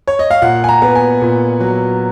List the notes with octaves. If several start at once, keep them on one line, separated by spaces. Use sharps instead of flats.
C#5
D#5
F5
A#2 F#5
G#5
A#5
B3
G#5
A#2
F#3